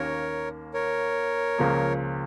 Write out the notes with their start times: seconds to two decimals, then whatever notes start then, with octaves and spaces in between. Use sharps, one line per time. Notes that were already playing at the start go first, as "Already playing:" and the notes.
Already playing: D#2 D#3 A#3 C#4 A#4 C#5
0.74 A#4 C#5
1.58 C#2 C#3 F3 A#3